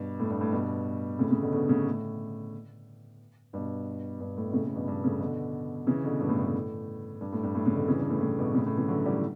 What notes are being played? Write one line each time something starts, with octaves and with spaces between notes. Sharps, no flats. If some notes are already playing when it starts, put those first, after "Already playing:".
Already playing: G2 B2
A2
G2
A2
G2 B2
A2 C#3
A2 C#3
B2 D3
B2 D3
A2 C#3
A2
G2 B2
G2
A2
B2
A2 C#3
A2
G2 B2
G2 B2
A2 C#3
B2 D3
C#3 E3
B2 D3
G2 B2
A2
G2
A2
G2
A2
G2
A2
A2 C#3
B2 D3
C#3 E3
G2
A2
A2
G2 B2
A2 C#3
A2 C#3
C#3 E3
D3 F#3
E3 G3
E3